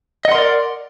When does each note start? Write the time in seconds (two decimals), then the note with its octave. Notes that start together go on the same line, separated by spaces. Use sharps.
0.25 D#5
0.28 F#5
0.32 C6
0.35 A#4
0.38 D5